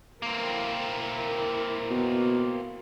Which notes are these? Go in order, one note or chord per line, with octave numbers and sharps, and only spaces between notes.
A#3 C4 E4 A#4
B2